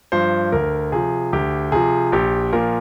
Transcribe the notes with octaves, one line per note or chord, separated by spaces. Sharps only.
G2 F3 C5
D2 A#4
C3 F3 G#4
D2 G4
C3 F3 G#4
A#1 G4
A#2 F3 A#4